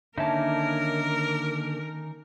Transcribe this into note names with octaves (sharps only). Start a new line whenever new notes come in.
D3 D#3 A#3 C#4 D#4 A#4 E5 A5